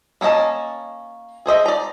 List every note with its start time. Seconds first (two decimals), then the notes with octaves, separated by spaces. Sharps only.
0.21 A#3 C#4 A#4 D#5 A5
1.46 G#4 C5 D#5 E5
1.66 D5 A#5